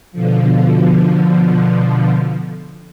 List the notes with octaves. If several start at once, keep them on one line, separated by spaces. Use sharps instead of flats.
B2 D3 F3